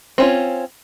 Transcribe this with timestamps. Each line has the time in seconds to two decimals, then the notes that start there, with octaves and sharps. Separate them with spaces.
0.18 C4 C#4 F4